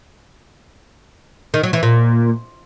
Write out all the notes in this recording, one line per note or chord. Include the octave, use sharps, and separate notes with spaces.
D#3
F#3
E3
A#2